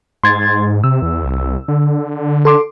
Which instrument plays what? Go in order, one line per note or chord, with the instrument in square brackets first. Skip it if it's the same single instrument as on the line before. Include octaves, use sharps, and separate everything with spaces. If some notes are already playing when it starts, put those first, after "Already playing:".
[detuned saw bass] G#2 [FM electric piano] C6 G#6 A6
[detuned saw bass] C3 [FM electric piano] E6
[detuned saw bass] E2
C2
D3
[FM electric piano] A4 C6 D6